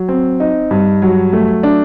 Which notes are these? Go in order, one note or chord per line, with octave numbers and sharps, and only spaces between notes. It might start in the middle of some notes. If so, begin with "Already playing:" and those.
Already playing: F#3
C4
D#4
G2
F#3
A3
D4